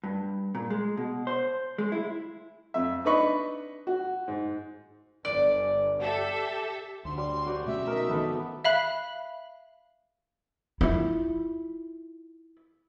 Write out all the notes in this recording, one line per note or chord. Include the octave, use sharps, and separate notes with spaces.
G2
A#2
G#3
B2
C5
G#3
E4
F2 E5
D4 D#4 B4 D#5 B5 C#6
F#4
G#2
G1 D5
G4 A4 E5
D2 D3 C6
G3 C6
D2 F#4 D5 G5
B2 A3 C#4 E5
D#4 A#4
G#1 D#3 E3 B3 D#4 A4
E5 F5 B5 F#6
E4 F4